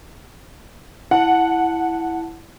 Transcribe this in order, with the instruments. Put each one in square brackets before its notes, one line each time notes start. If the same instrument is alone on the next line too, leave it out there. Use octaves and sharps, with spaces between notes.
[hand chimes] E4 A5 [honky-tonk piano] F#5